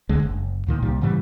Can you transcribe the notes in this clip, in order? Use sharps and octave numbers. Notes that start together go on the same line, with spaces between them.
D2 D3 G#3
F#1
D2 A#2 D#3
C2 A#2 G3
G#2 C#3 E3 G3